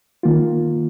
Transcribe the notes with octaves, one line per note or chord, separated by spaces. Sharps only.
D#3 A#3 F4